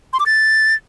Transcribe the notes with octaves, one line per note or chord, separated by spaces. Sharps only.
C6
D6
A6